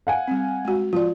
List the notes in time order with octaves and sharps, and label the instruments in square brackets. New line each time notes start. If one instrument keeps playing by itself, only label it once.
[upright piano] F5 F#5 G#5
[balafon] G3 C4
G#3 F#4
[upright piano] F3 [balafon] F4 D5